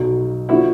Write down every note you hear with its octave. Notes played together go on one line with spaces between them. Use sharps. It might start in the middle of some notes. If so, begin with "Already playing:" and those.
Already playing: B1 B2 F#3
D3 F3 E4 F#4